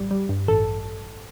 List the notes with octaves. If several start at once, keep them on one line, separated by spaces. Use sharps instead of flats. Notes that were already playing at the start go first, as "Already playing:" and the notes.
Already playing: A1 G3
G3
G2
A1 A4